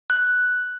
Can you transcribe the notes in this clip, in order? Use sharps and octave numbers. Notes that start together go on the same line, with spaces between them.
F#6